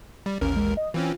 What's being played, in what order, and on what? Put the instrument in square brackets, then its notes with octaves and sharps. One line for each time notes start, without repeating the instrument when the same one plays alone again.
[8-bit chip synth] G3
[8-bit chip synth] A1 D#2 A#4 [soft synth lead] C#4
[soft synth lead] G#3
D#5
[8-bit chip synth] E3 C4 C#4 [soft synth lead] F4